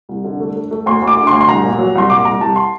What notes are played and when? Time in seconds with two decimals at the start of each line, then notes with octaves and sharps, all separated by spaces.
0.09 C2
0.24 D3
0.40 A3
0.56 A3
0.71 A3
0.86 D2 C6
1.02 D2
1.07 D6
1.17 D3
1.27 C6
1.33 D2
1.41 C6
1.49 C2 A#5
1.64 A#2
1.79 F#3
1.95 C2 C6
2.10 A#2 D6
2.25 C2 A#5
2.41 C2 A5
2.56 C6